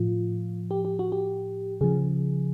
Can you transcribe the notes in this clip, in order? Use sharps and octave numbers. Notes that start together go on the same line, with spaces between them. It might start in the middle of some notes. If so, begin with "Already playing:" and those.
Already playing: A2 F3 F4
G4
G4
F#4
G4
C#3 F3 G#4